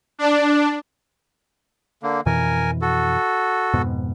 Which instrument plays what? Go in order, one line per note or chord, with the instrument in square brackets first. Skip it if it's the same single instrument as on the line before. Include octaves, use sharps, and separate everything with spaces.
[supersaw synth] D4
[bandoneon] D3 A#3
[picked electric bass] F2 B2 E3 [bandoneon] A#4 G#5
[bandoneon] F#4 A4
[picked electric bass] F2 G#2 B2